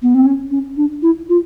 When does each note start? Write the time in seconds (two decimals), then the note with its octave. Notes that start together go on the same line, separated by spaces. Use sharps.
0.02 B3
0.15 C4
0.25 C#4
0.51 C#4
0.77 D4
1.02 E4
1.29 F4